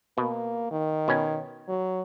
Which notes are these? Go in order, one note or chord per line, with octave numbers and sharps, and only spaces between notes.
B2 A#3
D#3
B2 C#4
F#3